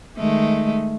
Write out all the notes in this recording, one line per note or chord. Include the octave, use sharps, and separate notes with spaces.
D#3 G#3 A3